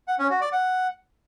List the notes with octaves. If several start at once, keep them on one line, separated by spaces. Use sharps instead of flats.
F#5
C#4
F#4
D5
F#5